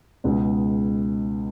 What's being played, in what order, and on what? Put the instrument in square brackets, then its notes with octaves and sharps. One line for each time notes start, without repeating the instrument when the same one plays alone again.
[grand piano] C#2 B2 G#3